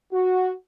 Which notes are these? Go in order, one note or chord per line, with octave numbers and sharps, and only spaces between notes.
F#4